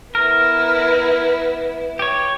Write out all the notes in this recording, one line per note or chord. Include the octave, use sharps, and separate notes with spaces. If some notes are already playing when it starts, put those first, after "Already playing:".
B3 E4 A#4
G4 C#5